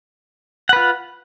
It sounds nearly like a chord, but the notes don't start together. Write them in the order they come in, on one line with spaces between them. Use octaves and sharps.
F#5 B4 F4